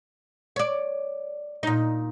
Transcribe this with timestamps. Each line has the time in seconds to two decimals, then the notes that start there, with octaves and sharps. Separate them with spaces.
0.56 C#5 D5
1.63 A#2 D#4